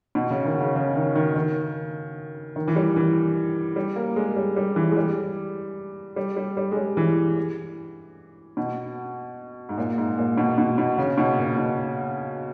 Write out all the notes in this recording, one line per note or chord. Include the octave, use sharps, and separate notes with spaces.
B2
C#3
D#3
C#3
C#3
D#3
D#3
D#3
D#3
E3
G3
E3
G3
A#3
G#3
G3
G3
E3
G#3
G3
G3
G3
G3
G#3
G3
E3
B2
G#2
A#2
G#2
A#2
B2
B2
B2
C#3
B2
A#2
B2